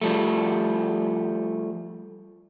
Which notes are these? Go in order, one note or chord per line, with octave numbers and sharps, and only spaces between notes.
F3 G3 A3